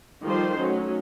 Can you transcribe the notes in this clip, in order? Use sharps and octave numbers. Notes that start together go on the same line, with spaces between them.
D#3 F3 G3 F4 A4 C5
F#3 A3 C#4 D#4